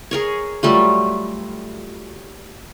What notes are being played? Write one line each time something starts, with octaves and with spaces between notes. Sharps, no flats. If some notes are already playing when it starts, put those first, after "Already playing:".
G#4 A#4 C#5
F#3 G3 A3 F4